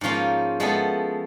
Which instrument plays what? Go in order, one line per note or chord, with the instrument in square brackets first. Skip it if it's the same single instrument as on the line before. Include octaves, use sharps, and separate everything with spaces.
[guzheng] G#2 F3 A#3 C#4 F4
F3 G#3 B3 E4 A4